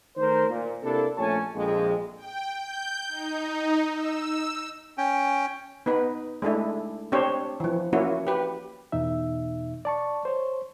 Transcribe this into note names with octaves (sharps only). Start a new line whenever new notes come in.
D#3 A3 A#4 C5
A#2
C3 A#3 D4 E4 G4 A4
A#1 A3 C#4 C#5 G#5 A5
A#1 F2 G#3
G5
G6
D#4
E6
C#4 G5
B3 D#4 B4
G#3 A3 D4 E4
C4 D4 G4 C5 C#5
E3 F3
A#3 C#4 E4 F#4
G4 B4
E2 B2 D#4 E5
D5 A5 C#6
C5 C#5